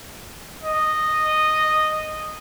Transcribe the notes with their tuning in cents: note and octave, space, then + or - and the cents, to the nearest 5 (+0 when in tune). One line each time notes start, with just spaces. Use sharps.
D#5 -10